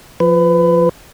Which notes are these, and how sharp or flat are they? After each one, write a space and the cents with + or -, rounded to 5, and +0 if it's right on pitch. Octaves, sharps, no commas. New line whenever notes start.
F3 +0 B4 +25